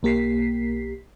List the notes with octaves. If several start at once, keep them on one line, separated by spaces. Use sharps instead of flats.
B1 A#3 G4 B6 C7